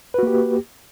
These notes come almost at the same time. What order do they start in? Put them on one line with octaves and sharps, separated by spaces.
B4 F#4 A#3 G4